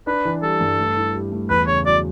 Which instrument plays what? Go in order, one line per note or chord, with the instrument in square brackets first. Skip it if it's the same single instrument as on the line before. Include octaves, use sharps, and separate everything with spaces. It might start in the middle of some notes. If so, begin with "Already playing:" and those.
[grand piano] D4 [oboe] B4
[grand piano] E3
[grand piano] G3 [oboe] A4
[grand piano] G2
A3
E4
G4
A3
[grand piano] E2 [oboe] B4
[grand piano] C#3 [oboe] C#5
[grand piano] F#3 [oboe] D5